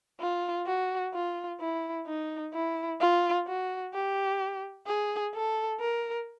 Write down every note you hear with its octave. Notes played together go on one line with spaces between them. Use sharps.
F4
F#4
F4
E4
D#4
E4
F4
F#4
G4
G#4
A4
A#4